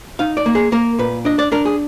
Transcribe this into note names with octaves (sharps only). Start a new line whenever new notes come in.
D#4 F5
D5
A#3
G#4
A#3 A#4
A#2 B4
D4 D#5
D5
D4 A#4
G#4